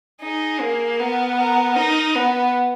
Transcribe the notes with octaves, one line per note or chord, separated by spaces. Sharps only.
D#4 G#4
A#3
B3 A#4
A#4
D#4 A#4
B3 B4